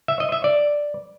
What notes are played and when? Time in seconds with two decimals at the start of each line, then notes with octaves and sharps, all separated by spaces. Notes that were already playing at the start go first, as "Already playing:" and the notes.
0.08 E5
0.20 D#5
0.32 E5
0.44 D5